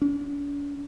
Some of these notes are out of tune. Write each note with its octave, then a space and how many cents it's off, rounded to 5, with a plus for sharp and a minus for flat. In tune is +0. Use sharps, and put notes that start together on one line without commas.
D4 -45